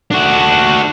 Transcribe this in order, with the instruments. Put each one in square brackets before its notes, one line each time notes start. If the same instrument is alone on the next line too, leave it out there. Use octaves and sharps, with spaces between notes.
[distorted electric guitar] D4 F#4